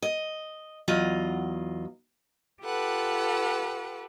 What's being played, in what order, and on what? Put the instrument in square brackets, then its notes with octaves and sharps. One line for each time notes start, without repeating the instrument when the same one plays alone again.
[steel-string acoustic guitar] D#5
E2 F#3 F4 D#5
[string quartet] F4 G4 A4 B4 F#5